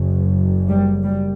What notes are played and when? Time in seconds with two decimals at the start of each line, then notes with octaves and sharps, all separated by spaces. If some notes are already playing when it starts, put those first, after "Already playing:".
Already playing: F#1 F#2
0.69 G3
1.04 G3